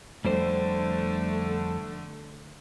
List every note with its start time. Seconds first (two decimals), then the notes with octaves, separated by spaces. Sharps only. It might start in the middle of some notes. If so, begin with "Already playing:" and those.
0.24 F2 D3 G3 A3 C5